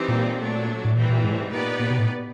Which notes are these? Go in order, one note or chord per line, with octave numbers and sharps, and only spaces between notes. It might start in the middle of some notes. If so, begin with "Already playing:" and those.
Already playing: E3 G3 C4 D#4 G4
A#2
F#3 A3 D4
A2
A#2 E3 G3 C4
A#2
G#2
A2
G#2
A#2 B3 D#4 G4 B4 D5
A#2
B2
A2